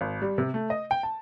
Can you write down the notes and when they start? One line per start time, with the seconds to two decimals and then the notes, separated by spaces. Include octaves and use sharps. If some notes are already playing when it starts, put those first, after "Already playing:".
0.01 G#1
0.22 G3
0.38 C3
0.54 A3
0.70 D#5
0.91 G5
1.03 A5